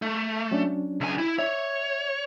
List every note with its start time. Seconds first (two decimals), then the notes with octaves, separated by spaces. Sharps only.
0.02 A3
0.51 F#3 C#4 D4
1.01 C#2 G#5
1.18 E4
1.39 C#5 E5